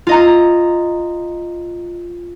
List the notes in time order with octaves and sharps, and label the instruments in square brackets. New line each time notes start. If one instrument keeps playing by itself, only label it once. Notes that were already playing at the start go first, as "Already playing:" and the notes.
[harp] F4 D#5 A#5